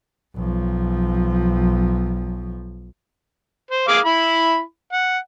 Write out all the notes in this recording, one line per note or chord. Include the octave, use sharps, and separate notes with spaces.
B1 F3
C5
G#4 F5 D6
E4 B5
F#5